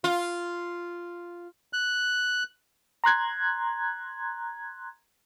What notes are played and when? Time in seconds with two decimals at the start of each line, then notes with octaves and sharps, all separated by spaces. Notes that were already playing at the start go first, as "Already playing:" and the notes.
0.04 F4
1.73 F#6
3.04 A#5 C6 F#6 G#6